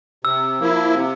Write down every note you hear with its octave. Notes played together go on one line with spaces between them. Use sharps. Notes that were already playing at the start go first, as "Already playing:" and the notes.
C3 E6
F3 A#3 E4
C3